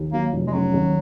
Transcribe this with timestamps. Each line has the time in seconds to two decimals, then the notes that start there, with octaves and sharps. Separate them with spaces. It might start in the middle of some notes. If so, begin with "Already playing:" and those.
Already playing: D#2
0.13 F#3 A#3
0.33 F1
0.47 G#3
0.53 C#3 F#3
0.74 D#2